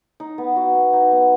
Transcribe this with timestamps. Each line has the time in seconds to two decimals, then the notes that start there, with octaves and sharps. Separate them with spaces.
0.20 D#4
0.38 B3
0.56 F#4
0.75 B3
0.93 D#4
1.12 B3